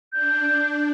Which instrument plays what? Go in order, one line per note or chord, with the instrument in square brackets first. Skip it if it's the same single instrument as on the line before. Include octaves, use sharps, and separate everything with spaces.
[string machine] D4 [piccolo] G6